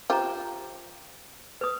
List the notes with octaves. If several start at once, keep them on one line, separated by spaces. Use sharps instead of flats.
F4 G4 C5 A#5
B4 D#6